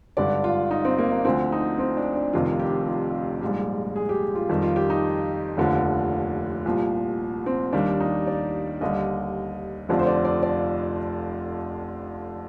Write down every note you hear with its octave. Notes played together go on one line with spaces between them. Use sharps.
G#1 G2 D3 D5
F4
D#4
C4
A#3
A#3
D2 D3 F3 C4
D#4
C4
D4
D4
F1 F2 C3 D#3 F4
G4
F4
A#1 G#2 G3
G#4
G4
F4
F2 D#3 G3
F4
G4
D#4
F1 D#2 D3 F3
C2 A#2 F3
C4
D#2 D#3 G3 D4
D#4
D5
D#2 D3 G3 D#5
F1 F2 D3 F3 D5
C5
D5
D5
D5